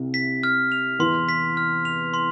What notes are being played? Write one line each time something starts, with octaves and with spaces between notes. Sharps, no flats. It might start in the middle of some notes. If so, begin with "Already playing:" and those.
Already playing: C2 C3
B6
F6
F7
E2 E3 C6
B6
F6
F7
C6